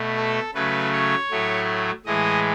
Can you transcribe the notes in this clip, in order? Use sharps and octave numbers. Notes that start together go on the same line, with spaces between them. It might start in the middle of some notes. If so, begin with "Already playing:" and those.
Already playing: B2 A3
A4
C#3 F#3 A3 B4
C#5
A2 F#3 A3
A2 E3 G#3 D#5